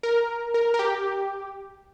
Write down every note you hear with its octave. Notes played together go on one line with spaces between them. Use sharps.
A#4
A#4
A#4
G4